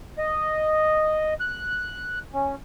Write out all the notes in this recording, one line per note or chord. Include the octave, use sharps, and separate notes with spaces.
D#5
F#6
C#4